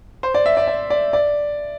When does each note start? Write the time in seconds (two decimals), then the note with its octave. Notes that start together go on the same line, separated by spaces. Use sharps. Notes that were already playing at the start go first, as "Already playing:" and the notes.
0.23 C5
0.34 D5
0.46 E5
0.57 D5
0.68 D5
0.90 D5
1.13 D5